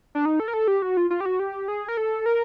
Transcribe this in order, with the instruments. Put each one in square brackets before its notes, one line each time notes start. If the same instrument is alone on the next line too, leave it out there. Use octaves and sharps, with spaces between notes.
[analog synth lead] D4
D#4
A4
A#4
A4
G4
F#4
F4
F4
G4
F#4
G4
G#4
A#4
A4
A#4